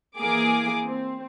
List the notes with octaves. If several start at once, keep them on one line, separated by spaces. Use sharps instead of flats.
E3 A#3 G#4 D6
C4